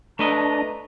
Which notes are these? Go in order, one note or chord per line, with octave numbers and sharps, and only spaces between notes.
A3 D4 B4 D#5 A#5